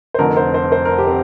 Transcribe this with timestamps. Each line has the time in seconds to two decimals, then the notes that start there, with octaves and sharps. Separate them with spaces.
0.14 C5
0.19 F1 F2 D3 A#4
0.37 C5
0.54 C5
0.72 C5
0.85 A#4
0.98 G4
1.07 C4